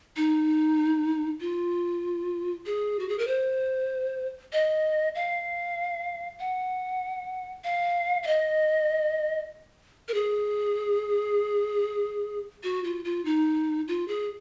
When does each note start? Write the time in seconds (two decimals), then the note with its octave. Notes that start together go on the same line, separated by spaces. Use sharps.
0.17 D#4
1.41 F4
2.66 G#4
2.99 F#4
3.09 G#4
3.19 A#4
3.27 C5
4.53 D#5
5.15 F5
6.40 F#5
7.64 F5
8.23 F5
8.27 D#5
10.08 A#4
10.14 G#4
12.63 F#4
12.84 F4
13.05 F4
13.25 D#4
13.88 F4
14.08 G#4